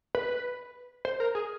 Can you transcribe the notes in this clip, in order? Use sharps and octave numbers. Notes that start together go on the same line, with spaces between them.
B4
C5
A#4
G#4